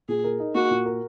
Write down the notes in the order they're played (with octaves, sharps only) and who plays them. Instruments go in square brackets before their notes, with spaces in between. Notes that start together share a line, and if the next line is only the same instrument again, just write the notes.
[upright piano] A#2 [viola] G#4
[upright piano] A#4
D#4
[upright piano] A#3 [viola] F#4
[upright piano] A#2
A#4